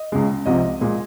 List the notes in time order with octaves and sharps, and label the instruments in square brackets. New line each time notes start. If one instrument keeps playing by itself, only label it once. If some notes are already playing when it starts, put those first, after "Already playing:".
Already playing: [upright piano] D#5
C#2 C#3 G#3
C2 C3 F3 D#5
A#2 G#3